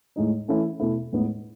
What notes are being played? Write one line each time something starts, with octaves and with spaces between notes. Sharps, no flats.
A2 G#3 D#4
E3 A3 C#4 E4
B2 A3 E4
A2 G#3 B3 D#4